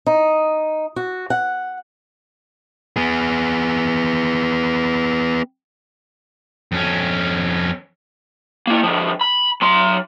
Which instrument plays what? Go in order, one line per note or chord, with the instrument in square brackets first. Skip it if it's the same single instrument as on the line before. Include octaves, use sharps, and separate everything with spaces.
[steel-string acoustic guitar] D#4
F#4
F#5
[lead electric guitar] B3 G#4
[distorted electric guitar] F2 C#4
[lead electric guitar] A#3 E4
D3 F3
B5
F#3 C6